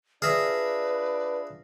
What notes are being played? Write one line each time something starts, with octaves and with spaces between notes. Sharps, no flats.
D4 F4 G#4 B4 D5 E5 F6 A#6